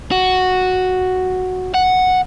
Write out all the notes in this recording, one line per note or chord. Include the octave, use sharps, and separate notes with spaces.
F#4
F#5